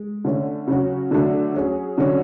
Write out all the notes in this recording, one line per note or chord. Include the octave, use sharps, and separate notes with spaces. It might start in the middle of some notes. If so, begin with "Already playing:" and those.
Already playing: G#3
D3 A3 C#4
C#3 F#3 C#4 F#4
D3 F#3 A3 D4
F#3 C#4 G#4
D3 F#3 C#4